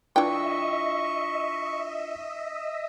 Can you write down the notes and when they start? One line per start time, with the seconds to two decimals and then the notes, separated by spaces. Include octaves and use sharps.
0.16 E3 D4 E4 F4 D#5 E5 G5 C#6